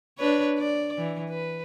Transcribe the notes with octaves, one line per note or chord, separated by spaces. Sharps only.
D4 B4 C#5
D5
E3
B4